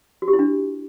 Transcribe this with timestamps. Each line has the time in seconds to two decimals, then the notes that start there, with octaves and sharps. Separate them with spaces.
0.22 F#4
0.28 G4
0.33 E4
0.39 D4